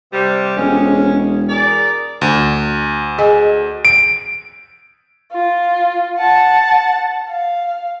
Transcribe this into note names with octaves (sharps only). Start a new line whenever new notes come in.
C3 G3
E1 F2 G#3 C#4
G#4 A#4 D5
D2
G#4 D#5 G#5
D7
F4
F#5 A5
F5